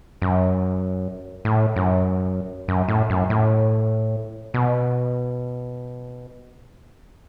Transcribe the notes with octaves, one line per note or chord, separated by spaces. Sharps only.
F#2
A2
F#2
F#2
A2
F#2
A2
B2